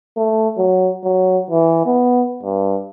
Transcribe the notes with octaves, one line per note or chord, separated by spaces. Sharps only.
A3
F#3
F#3
E3
B3
G2